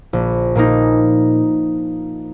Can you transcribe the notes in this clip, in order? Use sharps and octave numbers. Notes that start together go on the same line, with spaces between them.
A#1
A#2 A#3 D#4